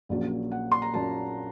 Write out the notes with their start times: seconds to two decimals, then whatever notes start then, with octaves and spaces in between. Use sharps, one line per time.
0.09 A#1 A#2 F#3 A#3 C#4
0.51 F#5
0.72 C6
0.82 A#5
0.94 A#2 F#3 A#3 C#4 A5